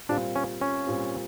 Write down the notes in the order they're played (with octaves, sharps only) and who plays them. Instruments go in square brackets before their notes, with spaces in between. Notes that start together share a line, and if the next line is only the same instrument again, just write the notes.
[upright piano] A#2 G3 C4 F4 [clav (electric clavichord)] D4
[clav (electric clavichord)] C#4
C#4
[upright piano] A#2 G3 C4